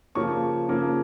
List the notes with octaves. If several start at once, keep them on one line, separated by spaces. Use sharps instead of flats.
C#3 F3 A#3 C#4 C#6
C#3 F3 A#3 C#4